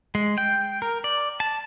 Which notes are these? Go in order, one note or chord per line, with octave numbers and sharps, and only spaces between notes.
G#3
G5
A#4
D5
A5